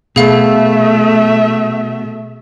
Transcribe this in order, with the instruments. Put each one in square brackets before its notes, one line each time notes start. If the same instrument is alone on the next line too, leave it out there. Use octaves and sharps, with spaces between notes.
[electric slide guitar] B2 [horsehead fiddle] A3 E5 [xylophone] G#4 F5